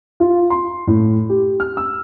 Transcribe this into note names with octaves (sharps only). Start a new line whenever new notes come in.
F4
C6
A2
G4
F6
E6